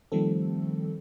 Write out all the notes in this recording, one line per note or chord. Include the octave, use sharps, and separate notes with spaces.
D#3 F3 G3 A3 C4 A4